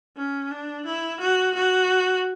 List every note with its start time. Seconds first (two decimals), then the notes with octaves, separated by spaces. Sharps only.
0.17 C#4
0.51 D4
0.86 E4
1.20 F#4
1.55 F#4